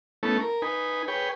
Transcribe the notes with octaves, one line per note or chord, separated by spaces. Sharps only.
A3 B3 C#4 E4 A4
A#4
D#4 B4 G#5
G#4 B4 C#5 G5